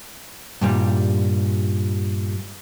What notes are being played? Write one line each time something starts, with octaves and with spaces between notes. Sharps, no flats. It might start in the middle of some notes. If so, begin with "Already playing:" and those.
G2 A#2 G3